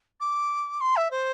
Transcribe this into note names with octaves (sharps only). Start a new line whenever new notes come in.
D6
C6
E5
C5